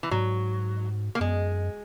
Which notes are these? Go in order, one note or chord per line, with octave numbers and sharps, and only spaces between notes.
E3
G#2 F#3
A#3
F#2 G#3